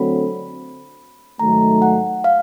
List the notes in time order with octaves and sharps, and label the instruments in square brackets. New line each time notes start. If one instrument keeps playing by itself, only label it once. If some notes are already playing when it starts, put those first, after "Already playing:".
Already playing: [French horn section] D3 F#3 A3 C4 [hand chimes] B5
[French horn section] G#2 D#3 F#3 A3 [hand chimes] A#5
[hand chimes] F#5
F5